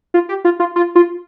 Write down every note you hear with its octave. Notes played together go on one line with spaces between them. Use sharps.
F4
G4
F4
F4
F4
F4